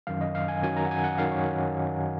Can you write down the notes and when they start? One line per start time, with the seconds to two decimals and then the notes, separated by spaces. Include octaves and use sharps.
0.07 F#2 D#3 F#3 F5
0.21 D#5
0.35 F5
0.48 G#5
0.62 F#2 D#3 F#3 G#5
0.77 A#5
0.85 F#5
0.91 G#5
1.04 F#5
1.18 F#2 D#3 F#3 F5
1.32 C#5